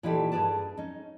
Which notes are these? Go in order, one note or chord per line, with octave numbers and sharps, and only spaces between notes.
A#2 E3 D#4 G4 A4
G2 G#4 B4 D5 A5
C#4 D#4